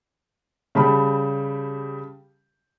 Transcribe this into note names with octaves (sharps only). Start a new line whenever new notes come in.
C#3 G3 G4 A5 B5